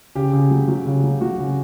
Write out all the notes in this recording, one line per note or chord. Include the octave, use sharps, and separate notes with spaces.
C#3 G4
C#3
F#3
F#3
C#3
F#3
F#3 F#4
C#3